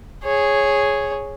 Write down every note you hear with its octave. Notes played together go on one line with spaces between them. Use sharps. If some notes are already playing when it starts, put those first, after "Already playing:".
G#4 C#5